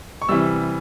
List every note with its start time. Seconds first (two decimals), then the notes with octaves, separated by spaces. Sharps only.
0.22 C#6
0.29 C3 E3 G3 E6